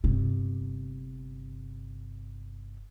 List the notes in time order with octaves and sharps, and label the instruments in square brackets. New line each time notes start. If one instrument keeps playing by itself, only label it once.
[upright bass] G1 C3